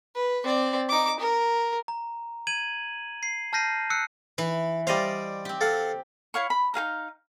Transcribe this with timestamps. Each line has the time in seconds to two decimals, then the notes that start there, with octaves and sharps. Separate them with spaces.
0.15 B4
0.44 C4 D5
0.89 D#4 D6
1.20 A#4
1.88 A#5
2.47 G#6 D#7 F#7
3.23 C7
3.53 A5 F6 G6 A#6 C7 D#7
3.90 E6 F#6 C7 C#7
4.38 E3 B4
4.87 G3 C5 D5 D#5 F5
5.45 C4 G4
5.61 A4 F5 F#5
6.34 E4 C#5 F5 C#6
6.50 B5
6.74 D#4 G#4 F5 A#5